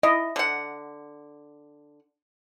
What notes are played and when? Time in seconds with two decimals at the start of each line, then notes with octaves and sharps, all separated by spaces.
0.03 E4 D#5
0.36 D3 F#5